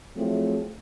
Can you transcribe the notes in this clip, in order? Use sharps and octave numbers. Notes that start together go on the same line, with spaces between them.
F3 F#3 A3 C4 E4 G#4